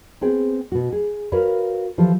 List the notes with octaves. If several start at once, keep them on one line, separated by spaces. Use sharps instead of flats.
B3 C4 G#4 G5
B2 F#4
G#4
F#4 A#4 B4 C#5 F5
E3 F3 G4 A4